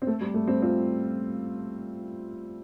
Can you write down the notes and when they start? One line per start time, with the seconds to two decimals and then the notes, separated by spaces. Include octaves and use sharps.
0.02 C4
0.07 A3
0.21 G3
0.34 A3
0.48 G3 C4
0.62 C4 F4